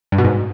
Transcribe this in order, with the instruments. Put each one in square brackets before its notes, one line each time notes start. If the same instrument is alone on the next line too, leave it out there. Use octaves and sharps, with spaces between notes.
[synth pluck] G2
B2
G#2